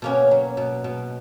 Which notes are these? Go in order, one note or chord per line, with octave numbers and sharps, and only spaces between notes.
B2 A#3 C#4
F#3
B2
B2